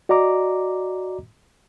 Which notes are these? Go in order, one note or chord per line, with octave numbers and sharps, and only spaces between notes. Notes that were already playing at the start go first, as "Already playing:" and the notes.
F#4 D5 D#5 A#5 D6